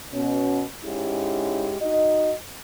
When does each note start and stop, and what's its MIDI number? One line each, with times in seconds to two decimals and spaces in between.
0.13 0.62 47
0.13 0.62 61
0.84 1.75 44
0.84 1.75 56
0.84 1.75 61
0.84 1.75 64
0.84 1.75 67
1.80 2.32 63
1.80 2.32 66
1.80 2.32 75